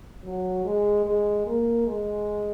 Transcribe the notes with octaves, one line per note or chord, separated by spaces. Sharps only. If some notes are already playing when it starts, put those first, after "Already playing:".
F#3
G#3
G#3
A#3
G#3